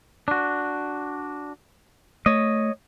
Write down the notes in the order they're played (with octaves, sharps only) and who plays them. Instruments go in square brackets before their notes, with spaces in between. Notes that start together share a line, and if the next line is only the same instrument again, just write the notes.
[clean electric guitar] D4 F#4
[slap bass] A3 [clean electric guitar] C#5 D#5